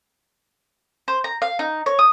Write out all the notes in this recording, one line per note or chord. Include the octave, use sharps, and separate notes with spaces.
C5
A#5
F5
D#4
C#5
D#6